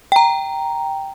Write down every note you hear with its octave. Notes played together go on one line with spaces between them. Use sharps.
G5 A#5